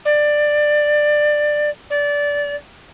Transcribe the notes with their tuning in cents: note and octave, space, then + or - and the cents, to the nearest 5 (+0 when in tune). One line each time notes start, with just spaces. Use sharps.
D5 +15
D5 -20